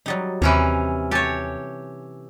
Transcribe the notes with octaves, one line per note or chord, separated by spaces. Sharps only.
F#3 G3 D#4
D#2 C3 E3 C#4 A#5
G4 A4 C#5 G#5 A5